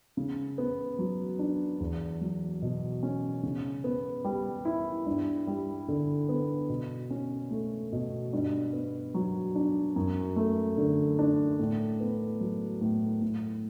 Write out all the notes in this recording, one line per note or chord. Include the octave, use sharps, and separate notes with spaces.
C#3
B3
F#3
D4
E2
F#3
B2
C#4
C#3
B3
G3
E4
G2
G3
D3
B3
B2
C#4
A3
B2
G2
B3
F#3
D4
F#2
A3
D3
D4
A2
B3
F#3
A2
A2